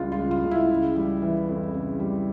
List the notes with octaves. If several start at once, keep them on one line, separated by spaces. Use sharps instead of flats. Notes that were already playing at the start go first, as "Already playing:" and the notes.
Already playing: C#2 G3 F4
F4
C#3
F4
C#2
E4
C#3
G3
E3
F2
C#3
G3